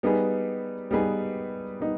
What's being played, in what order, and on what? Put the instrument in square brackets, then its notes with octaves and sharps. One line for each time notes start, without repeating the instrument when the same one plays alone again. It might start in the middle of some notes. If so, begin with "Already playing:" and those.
[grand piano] G3 B3 D#4 G#4 B4
G3 B3 D#4 G#4 B4
G3 B3 D#4